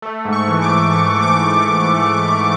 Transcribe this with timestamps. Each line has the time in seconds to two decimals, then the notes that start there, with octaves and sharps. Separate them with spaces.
0.02 A3
0.25 G#2
0.33 C#6
0.48 E3
0.62 D6
0.70 E3
0.92 E3 C#6
1.15 E3
1.22 D6